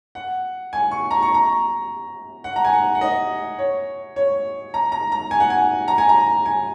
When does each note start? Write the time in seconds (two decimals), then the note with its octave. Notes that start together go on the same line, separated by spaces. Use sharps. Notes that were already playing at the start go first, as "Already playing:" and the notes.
0.15 F#5
0.73 G#5
0.91 C#6
1.11 A#5
1.22 C#6
1.34 A#5
2.44 F#5
2.56 A#5
2.65 G#5
2.73 F#5
2.95 F#5
3.01 D#5
3.59 C#5
4.16 C#5
4.74 A#5
4.92 A#5
5.12 A#5
5.31 G#5
5.40 F#5
5.50 G#5
5.88 A#5
5.98 G#5
6.09 A#5
6.46 G#5